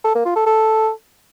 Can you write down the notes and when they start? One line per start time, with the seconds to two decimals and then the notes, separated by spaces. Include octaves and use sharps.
0.04 A4
0.15 A#3
0.25 F4
0.36 A4
0.46 A4